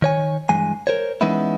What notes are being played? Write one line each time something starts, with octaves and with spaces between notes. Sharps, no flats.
D#3 C#5 G#5
G2 E3 G#3 G#5
A#4 C5 C#5
E3 G#3 B3 C#4 D#4 E4